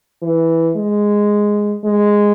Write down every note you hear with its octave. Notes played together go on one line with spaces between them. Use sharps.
E3
G#3
G#3